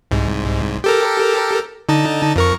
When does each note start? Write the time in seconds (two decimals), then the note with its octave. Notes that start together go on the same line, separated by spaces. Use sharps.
0.11 C2 G#2
0.84 G4 A4 A#4
1.89 D3 D#4 A5
2.36 F2 A#4 C#6